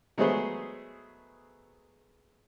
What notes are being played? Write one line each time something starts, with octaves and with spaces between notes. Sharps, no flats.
F#3 G#3 A3 B3 G#4 C5